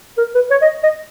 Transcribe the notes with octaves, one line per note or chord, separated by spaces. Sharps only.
A#4
B4
C#5
D#5
D#5